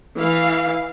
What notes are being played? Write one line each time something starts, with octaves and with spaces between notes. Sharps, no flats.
E3 F5